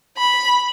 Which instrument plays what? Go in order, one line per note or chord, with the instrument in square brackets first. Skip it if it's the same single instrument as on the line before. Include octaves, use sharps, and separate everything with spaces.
[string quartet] B5